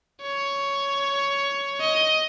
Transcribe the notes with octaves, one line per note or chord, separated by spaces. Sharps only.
C#5
D#5